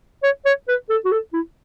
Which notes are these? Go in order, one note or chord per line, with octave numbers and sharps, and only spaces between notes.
C#5
C#5
B4
A4
F#4
A4
E4